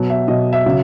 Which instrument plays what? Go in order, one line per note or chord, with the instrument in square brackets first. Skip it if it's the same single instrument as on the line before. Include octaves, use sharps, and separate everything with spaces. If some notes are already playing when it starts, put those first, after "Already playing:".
Already playing: [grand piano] B2 F#3
E5
B2 F#3 D#5
E5
C#3 F#3